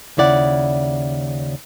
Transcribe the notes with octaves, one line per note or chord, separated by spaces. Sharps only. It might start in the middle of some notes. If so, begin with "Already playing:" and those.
D#2 C#3 E4 D5 F#5